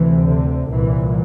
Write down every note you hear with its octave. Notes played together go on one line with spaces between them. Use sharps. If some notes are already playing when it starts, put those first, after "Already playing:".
Already playing: D2 C3 E3
D3
C2 A#2 E3